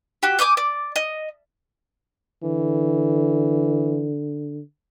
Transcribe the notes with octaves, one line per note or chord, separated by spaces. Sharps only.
F#4 G4
G#5 D6 D#6 G6
D5
D#5
D3 E3